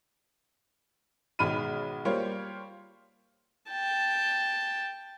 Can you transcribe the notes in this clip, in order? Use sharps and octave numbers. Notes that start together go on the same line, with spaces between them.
B1 D#3 G#3 B5 F6 D#7
G3 A#3 F4 C5 C#5
G5 A5